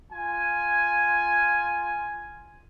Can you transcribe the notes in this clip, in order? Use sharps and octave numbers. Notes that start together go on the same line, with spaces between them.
F4 G#5